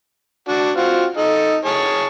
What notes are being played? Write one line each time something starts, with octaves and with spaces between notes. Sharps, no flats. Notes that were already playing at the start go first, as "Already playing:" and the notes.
D4 F#4
C4 F4 F#4
D#4 A4
G#4 C#5 A5